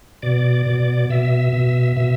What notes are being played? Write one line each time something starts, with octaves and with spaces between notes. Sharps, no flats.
B2 D5
B2
B2 E5
B2
B2 E5